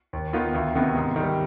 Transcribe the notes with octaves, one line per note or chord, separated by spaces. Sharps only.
D#2
D#3 B3 F4
D2
C3 D#3 B3
G#2
D#3 G3